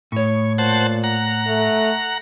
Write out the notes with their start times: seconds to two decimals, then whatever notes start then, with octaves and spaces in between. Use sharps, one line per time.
0.12 A2 C#5 C#6
0.58 A#2 C5 F#5 A5
1.04 F#5 A#5
1.47 A3